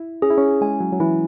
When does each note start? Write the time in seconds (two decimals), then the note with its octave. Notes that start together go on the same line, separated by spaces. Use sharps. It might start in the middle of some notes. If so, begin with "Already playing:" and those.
Already playing: E4
0.22 C#4 G#4
0.30 E4
0.38 C#4
0.61 G#3 G#5
0.81 F#3
0.93 F#3
1.00 E3 E4